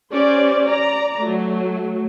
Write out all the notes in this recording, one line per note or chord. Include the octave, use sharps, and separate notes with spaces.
C#4 G4 C5 D5
D5 A#5
F#3 A3